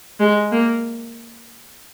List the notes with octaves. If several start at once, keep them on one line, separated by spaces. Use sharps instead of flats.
G#3
A#3